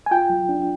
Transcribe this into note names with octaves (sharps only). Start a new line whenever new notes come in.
G#5
F4 G5
F#3
D4